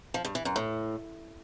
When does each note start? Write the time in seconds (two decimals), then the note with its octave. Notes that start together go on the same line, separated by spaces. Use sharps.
0.14 F3
0.25 G2
0.35 E3
0.45 F#2
0.56 A2